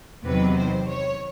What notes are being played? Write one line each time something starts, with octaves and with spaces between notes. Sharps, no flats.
E2 C3 D#3 F#3 B4
C5
C#5